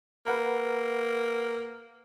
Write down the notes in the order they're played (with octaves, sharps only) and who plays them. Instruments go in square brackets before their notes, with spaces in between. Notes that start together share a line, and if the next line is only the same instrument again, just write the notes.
[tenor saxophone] A#3 [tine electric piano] B4 F#5 A#5